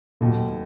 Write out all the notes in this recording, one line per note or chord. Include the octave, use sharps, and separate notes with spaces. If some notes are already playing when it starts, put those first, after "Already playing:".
F1 D#2 A#2 D#3 F#3